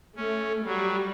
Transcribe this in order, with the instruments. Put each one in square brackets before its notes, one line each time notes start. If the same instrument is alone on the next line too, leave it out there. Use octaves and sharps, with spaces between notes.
[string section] A3 [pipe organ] C#4
[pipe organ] F#3 [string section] G3